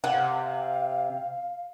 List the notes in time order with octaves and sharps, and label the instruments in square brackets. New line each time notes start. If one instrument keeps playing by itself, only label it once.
[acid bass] C3 [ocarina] F5 [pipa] F#5